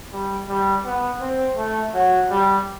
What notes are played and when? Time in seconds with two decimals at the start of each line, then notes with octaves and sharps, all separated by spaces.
0.13 G3
0.49 G3
0.85 B3
1.21 C4
1.57 A3
1.94 F#3
2.30 G3